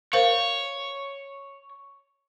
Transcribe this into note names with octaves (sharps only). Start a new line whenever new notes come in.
A#4 C5 C#5 F5